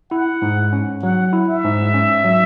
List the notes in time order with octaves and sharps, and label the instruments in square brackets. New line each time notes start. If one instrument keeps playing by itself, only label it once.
[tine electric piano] E4 [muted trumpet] F#5
[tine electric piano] G#2
C#4
[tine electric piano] F#3 [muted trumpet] F#5
[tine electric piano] E4
[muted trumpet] E5
[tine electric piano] G#2
C#4
F#3